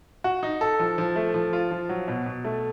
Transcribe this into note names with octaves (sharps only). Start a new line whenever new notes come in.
F#4
D#4
A4
F3
F3
A3
F3
F4
F3
F#3
B2
B2
A3